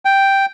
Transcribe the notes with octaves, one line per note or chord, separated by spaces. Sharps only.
G5